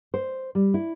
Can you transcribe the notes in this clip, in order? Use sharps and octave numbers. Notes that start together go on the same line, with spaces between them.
C5
G3
E4